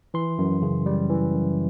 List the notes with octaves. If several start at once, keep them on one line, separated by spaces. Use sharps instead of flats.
E3 C6
F#2
C#3
G3
E3
F#2